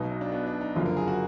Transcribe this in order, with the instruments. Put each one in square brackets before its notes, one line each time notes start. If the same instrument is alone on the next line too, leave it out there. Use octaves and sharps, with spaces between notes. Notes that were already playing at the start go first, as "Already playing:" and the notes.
Already playing: [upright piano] B1 B2 F#3 [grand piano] D#4
[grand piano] D#4
D4
B3
D4
D#4
[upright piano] F#1 F#2 D3 F3 [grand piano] F4
[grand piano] A#4
G#4
F#4